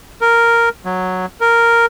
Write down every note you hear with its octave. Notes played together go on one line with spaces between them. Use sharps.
A#4
F#3
A#4